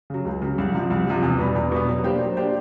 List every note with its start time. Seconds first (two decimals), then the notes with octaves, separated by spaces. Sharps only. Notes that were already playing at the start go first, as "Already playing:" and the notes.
0.10 C#3 F#3
0.25 C#2
0.42 C#3 F#3
0.58 C2
0.74 C3 F3
0.90 C2
1.07 C3 F3
1.23 E2
1.39 B2 G3 B3
1.55 E2
1.72 B2 G3 B3
1.87 F#3
2.03 A#3 D4 G4 C5
2.20 F#3
2.37 A#3 D4 G4 C5